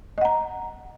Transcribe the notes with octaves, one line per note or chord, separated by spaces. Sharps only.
D#5 F#5 A#5